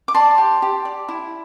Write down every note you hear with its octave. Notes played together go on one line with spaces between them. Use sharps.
D6
D5 A5 C6
G4
G4
D5
E4